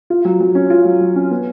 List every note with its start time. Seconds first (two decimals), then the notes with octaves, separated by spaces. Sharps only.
0.10 F4
0.25 F#3
0.40 F#3
0.55 C#4
0.70 F4
0.85 F#3
1.01 F#3
1.16 C#4
1.31 B3